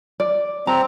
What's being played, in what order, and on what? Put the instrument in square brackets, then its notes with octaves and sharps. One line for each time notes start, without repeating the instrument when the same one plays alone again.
[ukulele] D5
[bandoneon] C4 [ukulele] A#5